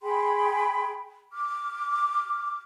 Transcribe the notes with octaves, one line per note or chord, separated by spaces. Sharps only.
G#4 G5 B5 C6
D6 F6